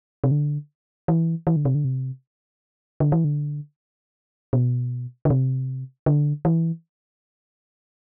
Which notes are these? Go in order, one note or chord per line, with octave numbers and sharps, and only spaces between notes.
C3
D3
E3
E3
D3
C3
D3
C3
D3
E3
D3
B2
D3
C3
D3
E3